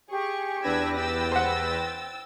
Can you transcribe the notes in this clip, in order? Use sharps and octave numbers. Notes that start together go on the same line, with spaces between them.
G4 G#4 C#6
E2 D4 B4 E6 G#6 A#6
G5 E6 A6
C5 F#5